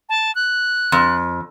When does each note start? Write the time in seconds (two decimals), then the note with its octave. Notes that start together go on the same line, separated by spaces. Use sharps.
0.09 A5
0.35 F#6
0.92 F2